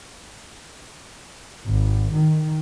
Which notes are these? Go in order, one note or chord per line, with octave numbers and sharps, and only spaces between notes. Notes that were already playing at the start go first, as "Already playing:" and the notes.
G#1
D#3